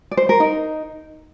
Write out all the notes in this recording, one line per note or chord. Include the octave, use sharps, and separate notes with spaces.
D5
C5
A#4
D#4